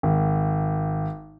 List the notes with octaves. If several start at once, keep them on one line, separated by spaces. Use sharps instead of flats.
G#1